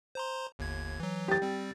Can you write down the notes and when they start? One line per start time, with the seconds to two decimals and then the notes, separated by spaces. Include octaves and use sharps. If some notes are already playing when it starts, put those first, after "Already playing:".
0.15 C5 A#5 C6
0.59 G1 D#2 G#6
1.00 E3 F#3
1.28 G4 A6
1.42 G3 C4